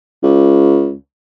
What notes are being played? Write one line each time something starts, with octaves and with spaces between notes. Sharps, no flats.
C#2